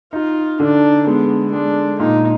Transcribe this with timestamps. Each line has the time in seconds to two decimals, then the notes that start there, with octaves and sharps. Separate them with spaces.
0.13 D#4 F4
0.60 D3 D4
1.07 G#3 B3
1.52 G#3 D4
1.99 A#2 D#4